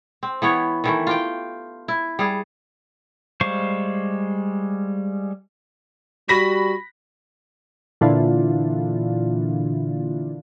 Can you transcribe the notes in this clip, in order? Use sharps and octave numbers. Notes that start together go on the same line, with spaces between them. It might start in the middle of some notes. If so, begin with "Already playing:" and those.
C4
E3 B3 C#5
D#3 E3 A3
F4 G4 G5
E4
G3 G#4
G3 G#3 C5 F5 C#6
G3 F#4 B5 A#6 B6
A#2 D3 E3 D4 E4 F4